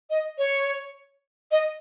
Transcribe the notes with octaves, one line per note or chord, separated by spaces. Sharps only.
D#5
C#5
D#5